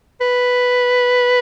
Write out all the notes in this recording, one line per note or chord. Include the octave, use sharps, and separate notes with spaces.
B4